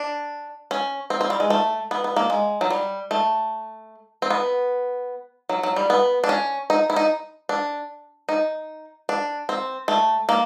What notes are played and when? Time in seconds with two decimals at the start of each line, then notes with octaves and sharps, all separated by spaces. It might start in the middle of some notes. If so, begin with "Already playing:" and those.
Already playing: D4
0.71 C#4
1.10 C4
1.21 C4
1.30 G3
1.40 G#3
1.50 A3
1.91 B3
2.04 B3
2.16 A#3
2.30 G#3
2.61 F#3
2.70 G3
3.11 A3
4.22 C4
4.30 B3
5.49 F#3
5.63 F#3
5.76 G3
5.90 B3
6.24 D4
6.29 C#4
6.70 D#4
6.90 E4
6.96 D#4
7.49 D4
8.29 D#4
9.09 D4
9.49 C4
9.88 A3
10.29 A#3